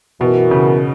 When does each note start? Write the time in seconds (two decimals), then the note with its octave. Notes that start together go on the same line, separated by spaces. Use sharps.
0.21 F#2 B2 E3 B3 F#4 A#4
0.51 C#3